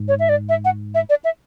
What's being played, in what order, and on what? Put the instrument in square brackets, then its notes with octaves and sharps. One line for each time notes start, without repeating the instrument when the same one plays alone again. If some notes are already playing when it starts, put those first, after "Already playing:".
Already playing: [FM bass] G#2
[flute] C#5
E5
D5
E5
F#5
E5
D5
E5